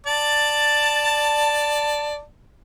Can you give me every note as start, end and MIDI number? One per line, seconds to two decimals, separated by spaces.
0.07 2.21 74
0.07 2.21 81